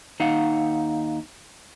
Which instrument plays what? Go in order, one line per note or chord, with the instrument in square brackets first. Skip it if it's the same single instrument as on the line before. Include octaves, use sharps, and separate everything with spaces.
[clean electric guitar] D#2 D#4 F5 F#5